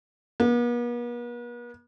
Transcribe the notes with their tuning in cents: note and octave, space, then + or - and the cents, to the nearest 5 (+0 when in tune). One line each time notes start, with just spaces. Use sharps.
B3 -45